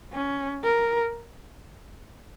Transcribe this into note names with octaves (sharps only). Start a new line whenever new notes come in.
C#4
A#4